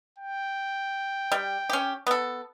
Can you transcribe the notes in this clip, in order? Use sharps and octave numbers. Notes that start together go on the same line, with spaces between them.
G5
G3
C#4 G4
B3 A4